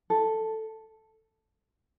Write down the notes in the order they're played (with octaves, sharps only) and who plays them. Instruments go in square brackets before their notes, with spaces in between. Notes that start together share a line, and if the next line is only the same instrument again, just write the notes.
[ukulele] A4